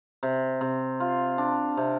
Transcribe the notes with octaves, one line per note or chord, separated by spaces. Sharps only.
C3
C3
F4
D4
C3